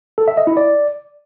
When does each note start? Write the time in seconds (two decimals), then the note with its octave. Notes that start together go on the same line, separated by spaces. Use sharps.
0.18 A4
0.28 E5
0.37 D#5
0.47 E4
0.57 D5